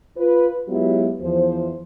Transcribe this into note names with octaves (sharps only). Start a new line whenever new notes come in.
F4 B4
F#3 G#3 B3 E4 F4 G4
E2 F3 C5